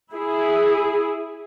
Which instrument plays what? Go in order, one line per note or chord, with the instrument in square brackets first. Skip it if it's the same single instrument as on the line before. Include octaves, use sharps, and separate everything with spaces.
[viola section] E4 G#4